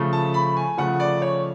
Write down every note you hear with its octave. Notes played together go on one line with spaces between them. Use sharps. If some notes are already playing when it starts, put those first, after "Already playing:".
Already playing: C#3 F3 A3
A5
B5
G#5
C#3 F3 A3 F#5
D5
C#5